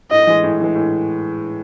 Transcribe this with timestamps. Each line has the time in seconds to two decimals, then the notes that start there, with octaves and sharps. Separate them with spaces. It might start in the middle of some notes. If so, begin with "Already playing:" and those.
0.11 A2 D#5
0.27 E3 G#3
0.43 A2
0.60 E3 G#3
0.75 A2